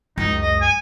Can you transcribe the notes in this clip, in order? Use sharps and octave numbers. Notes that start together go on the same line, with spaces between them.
C#2 F#2 D#4
D#5
G#5